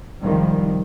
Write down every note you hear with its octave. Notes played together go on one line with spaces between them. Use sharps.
C2 G#2 C3 D#3 F3 G3